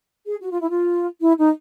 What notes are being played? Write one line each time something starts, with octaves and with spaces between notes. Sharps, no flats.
G#4
F#4
F4
E4
F4
E4
D#4